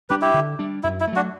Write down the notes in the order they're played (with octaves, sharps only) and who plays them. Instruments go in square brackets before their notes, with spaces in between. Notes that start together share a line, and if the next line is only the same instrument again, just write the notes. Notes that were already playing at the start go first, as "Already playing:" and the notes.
[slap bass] G3 D4 [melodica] G4 B4
[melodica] E4 G4
[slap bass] D3
G3 D4
[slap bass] F#2 [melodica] E4
[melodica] E4
[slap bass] A3
[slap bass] F#3 [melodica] D4 F#4